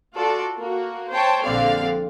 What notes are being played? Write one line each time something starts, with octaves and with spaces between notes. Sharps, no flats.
F4 F#4 A4 D5
A#3 F#4
C5 C#5 G5 A5
A#1 D3 C4 D5 F5